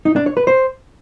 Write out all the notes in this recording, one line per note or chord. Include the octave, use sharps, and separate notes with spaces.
D#4
D4
C#5
B4
C5